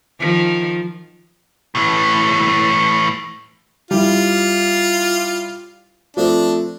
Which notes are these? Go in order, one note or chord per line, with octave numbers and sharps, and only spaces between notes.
D#3 F3
A2 E3
G3 E4 F4
F3 A3 C4 D4